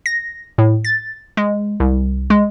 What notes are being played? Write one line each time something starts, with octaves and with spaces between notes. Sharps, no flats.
A#6
A2
A6
G#3
C2
G#3